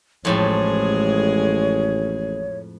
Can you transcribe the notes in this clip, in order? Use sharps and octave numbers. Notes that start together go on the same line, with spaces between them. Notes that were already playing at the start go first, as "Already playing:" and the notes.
A1 F2 A2 G#3 C4 G#4 C#5